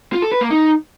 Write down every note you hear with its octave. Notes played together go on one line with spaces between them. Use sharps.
F4
A4
B4
A#3
D#4